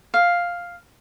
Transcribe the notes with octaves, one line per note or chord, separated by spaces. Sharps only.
F5